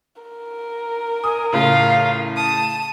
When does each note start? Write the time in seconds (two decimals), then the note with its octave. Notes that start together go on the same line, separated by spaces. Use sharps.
0.22 A#4
1.24 G#5 D#6
1.53 A2 C#3 F4 F5
2.36 A5 D#6